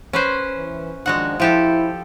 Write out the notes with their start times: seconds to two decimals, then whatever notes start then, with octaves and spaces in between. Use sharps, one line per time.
0.13 C#4 B4 C5
0.57 E3
1.06 D#3 F3 G#3 D4 F#4 F#5
1.40 F3 E4 G4 A4